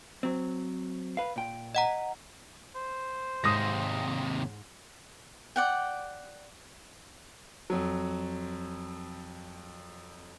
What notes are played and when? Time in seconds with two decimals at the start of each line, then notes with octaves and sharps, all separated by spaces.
0.23 F#3 C4
1.17 B4 F5
1.36 A#2 G5
1.75 D#5 F#5 A#5
2.75 C5
3.44 D#2 G#2 C3 D#6 A#6
5.56 D5 F#5 G5
7.70 F2 F#3